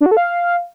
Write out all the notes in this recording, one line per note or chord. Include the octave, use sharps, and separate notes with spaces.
D4
F#4
A4
F5